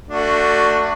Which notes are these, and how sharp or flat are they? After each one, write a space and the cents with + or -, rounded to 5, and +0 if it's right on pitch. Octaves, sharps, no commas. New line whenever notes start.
A3 +25 D4 +0 F#4 +0